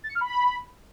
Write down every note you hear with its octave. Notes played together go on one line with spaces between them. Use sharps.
A6
C#7
F6
B5